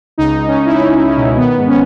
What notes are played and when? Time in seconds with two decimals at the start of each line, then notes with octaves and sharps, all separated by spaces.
0.18 C#2 D#4
0.38 C#2
0.47 C#4
0.58 C#2
0.66 E4
0.77 C#2 D#4
0.97 C#2
1.07 C#4
1.17 B2
1.37 D#3 B3
1.57 G#2
1.67 C#4